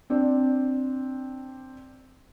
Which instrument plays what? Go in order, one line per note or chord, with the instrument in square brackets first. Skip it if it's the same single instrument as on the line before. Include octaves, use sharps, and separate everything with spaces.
[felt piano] C4 D4 D5